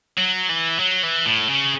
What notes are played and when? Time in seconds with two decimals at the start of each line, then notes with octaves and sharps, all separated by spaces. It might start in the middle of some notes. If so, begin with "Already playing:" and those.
0.17 F#3
0.49 E3
0.79 F#3
1.03 E3
1.25 A2
1.49 C#3